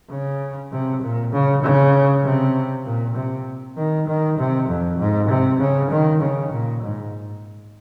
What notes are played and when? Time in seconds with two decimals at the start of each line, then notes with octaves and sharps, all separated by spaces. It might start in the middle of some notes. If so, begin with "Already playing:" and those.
0.10 C#3
0.72 C3
1.02 A#2
1.33 C#3
1.63 C#3
2.24 C3
2.85 A#2
3.16 C3
3.77 D#3
4.07 D#3
4.38 C3
4.68 F2
4.99 G#2
5.30 C3
5.60 C#3
5.91 D#3
6.21 C#3
6.52 A#2
6.82 G#2